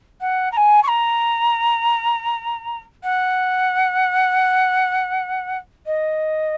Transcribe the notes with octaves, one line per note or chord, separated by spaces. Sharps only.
F#5
A#5
G#5
C#6
A#5
F#5
D#5